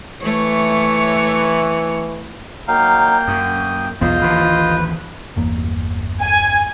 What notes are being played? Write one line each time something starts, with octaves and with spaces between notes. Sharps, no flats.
E3 A3 C#5
F#3 A#3 D#4 F5 G5
F#2 D#6
B1 E2 B3 F4 C5 D#5
A1 D#2 D3 B4
G1 E2 A#3
G#5